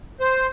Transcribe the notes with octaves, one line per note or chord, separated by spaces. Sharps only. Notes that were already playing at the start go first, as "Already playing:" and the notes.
C5